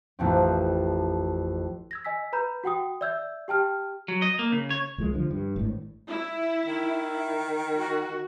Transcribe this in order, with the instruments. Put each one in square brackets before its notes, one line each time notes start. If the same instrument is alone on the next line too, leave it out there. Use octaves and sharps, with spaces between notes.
[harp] A1 F2 C4
[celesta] E6 G#6 A#6
D#5 G#5 E6 B6
B4 A#5 B5 G6
F#4 F#5 G5 D#6
D5 E5 E6 G6 G#6
G4 G5 A5 F6
[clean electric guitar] F#3
D#5
A#3
C#3
C#5
[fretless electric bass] C2 F3 G#3
D3 F3
G2
G#1 A2
[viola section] E4
[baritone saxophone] D#3
[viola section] F#4